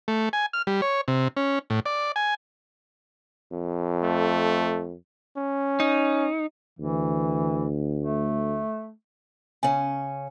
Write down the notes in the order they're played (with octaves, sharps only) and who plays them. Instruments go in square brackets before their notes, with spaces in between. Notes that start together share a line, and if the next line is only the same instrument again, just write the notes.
[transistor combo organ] A3
G#5
F6
G3
C#5
C3
C#4
A2
D5
G#5
[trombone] F2
[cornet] A3
C#4
[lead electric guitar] D#4
[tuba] D2 [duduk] E3
[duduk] A3
[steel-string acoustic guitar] C#3 C#4 [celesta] G#5